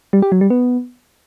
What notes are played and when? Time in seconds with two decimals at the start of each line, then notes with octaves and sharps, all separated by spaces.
0.13 G3
0.22 G4
0.32 F#3
0.41 G3
0.50 B3